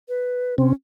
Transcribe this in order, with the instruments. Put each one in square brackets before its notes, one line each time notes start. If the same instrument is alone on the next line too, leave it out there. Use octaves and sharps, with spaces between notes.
[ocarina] B4
[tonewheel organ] C3 C4 [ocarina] C#4